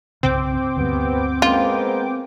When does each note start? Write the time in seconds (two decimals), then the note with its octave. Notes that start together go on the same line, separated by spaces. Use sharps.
0.23 C2 G2 C#3 C4 G5 D6
0.76 D2 G2 C3 B3
1.42 G#3 A#3 B3 C#4 F4